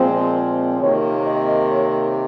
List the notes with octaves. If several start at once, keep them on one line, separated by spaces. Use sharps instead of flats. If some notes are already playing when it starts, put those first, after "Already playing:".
Already playing: A#2 F3 G#3 C4
C3 D#3 A#3 C#5
D#5
C#5